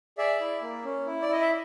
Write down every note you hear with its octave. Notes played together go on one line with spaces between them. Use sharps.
G#4 D5 E5
E4
A#3
C#4
E4
D5
E4 D#5
E5